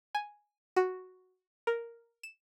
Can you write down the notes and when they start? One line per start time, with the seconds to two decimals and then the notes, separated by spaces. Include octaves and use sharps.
0.15 G#5
0.76 F#4
1.67 A#4
2.23 E7